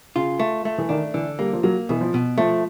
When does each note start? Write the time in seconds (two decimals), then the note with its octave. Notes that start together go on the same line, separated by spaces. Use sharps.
0.16 C#3 F4
0.39 A3
0.65 A3
0.78 E3
0.89 D#3 D4
1.14 D3 E3
1.39 G3 A#3
1.53 F3
1.63 F#3 A#3
1.89 B2 E3
2.01 F3
2.14 B2
2.38 F3 A3